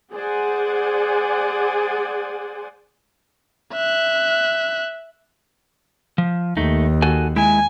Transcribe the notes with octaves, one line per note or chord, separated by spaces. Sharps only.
G#4 C5 D5 F#5 G#5
E5 F#6
F3
D#2 A3 D#4
F#4 A4 G#5
G#3 E4 G#5